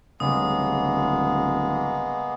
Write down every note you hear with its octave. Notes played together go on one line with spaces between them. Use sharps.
D1 C#3 G3 G#3 A#3 B3 D#6